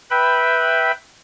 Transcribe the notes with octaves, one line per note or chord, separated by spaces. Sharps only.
B4 E5 G5 B5